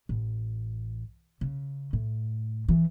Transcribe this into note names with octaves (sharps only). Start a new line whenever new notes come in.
A1
C#3
A2
E3